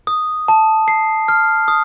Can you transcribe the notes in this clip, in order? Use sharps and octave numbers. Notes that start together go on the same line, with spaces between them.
D#6
A5
C7
F6
D#6